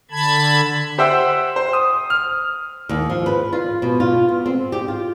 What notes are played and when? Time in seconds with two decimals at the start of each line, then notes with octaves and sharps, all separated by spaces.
0.11 D3 A5 B5 G#6
0.98 G4 C5 E5 F#5 G5 E6
1.56 C5
1.73 D#6
2.10 F6
2.89 D#2
3.10 F3
3.26 B4
3.53 F4
3.82 B2
4.00 F4
4.29 B3
4.46 C4
4.72 G4
4.88 F4